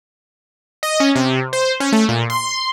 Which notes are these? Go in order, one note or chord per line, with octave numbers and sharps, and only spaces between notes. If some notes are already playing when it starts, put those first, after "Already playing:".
D#5
C#4
C3
C5
C#4
A3
A#2
C6